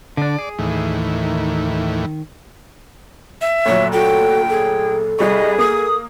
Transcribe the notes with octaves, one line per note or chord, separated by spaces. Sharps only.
D3 D4 D5
G#4
D#2 A2 E3
D#3
E5
D2 A#2 F#3 C#5
F#4 A4 G5
G#4 A4
C2 G3 G#4 D#5 C#6
A#3 D#6